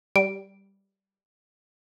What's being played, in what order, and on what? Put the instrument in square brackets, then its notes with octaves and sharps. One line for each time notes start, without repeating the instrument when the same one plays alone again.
[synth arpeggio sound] G3 [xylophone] D7